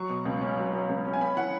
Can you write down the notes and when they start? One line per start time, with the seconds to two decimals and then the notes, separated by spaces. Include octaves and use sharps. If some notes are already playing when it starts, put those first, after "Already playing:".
Already playing: F#3 C#6
0.09 B2
0.25 C#2
0.41 C#4
0.57 F#3
0.73 F#3
0.89 C#2
1.05 C#4
1.13 G#5
1.21 C#4 B5
1.37 E3 F#5